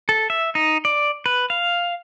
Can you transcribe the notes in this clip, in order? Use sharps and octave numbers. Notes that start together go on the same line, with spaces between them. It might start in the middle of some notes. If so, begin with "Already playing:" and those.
A4
E5
D#4
D5
B4
F5